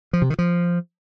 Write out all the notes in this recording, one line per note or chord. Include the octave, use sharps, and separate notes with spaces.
F3
C3
D#3
F3